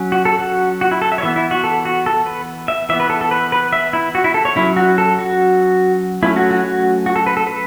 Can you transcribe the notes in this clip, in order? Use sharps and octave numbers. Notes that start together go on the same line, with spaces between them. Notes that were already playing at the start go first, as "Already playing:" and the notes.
Already playing: F#3 C#4
F#4
A4
F#4
F#4
E4
A4
E5
C#5
E3 B3 E5
E4
F#4
A4
F#4
A4
B4
E5
E3 B3 E5
B4
A4
A4
B4
B4
E5
E4
F#4
E4
A4
C#5
F#3 C#4 E4
F#4
A4
F#4
F#3 A3 C#4 E4
F#4
F#4
F#4
F#4
A4
B4
A4
B4